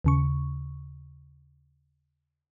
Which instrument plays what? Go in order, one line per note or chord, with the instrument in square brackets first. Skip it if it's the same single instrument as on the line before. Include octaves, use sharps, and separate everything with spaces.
[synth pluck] D#2 C#3 C#6